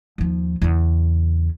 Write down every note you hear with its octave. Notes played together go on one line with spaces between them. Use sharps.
D#2 F3
E2 C#3